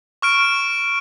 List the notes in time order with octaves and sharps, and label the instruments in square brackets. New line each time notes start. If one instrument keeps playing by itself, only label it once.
[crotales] C#6 F6 D7